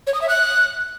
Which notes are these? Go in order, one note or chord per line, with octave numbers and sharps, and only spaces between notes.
C#5
D#6
E5
F#6